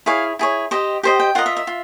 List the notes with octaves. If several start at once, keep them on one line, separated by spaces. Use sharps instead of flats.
E4 G#4 C#5 F5
E4 G#4 C#5
G4 C5 D#5
G4 C5 D#5 G5
G5
F4 A#4 D#5 F#5
E5
E5
F4